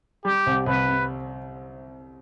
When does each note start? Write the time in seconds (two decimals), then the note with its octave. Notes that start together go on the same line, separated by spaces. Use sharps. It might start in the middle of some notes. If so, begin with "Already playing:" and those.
0.24 G3 G4
0.46 C2
0.66 C2 B4
0.89 C3